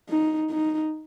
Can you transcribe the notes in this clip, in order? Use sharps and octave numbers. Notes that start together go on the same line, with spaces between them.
D#4
D#4